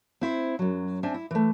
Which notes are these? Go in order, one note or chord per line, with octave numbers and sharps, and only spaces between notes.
C4 E4 C5
F#2 F#3
C4 D4 E5 G#5
E4
E3 A3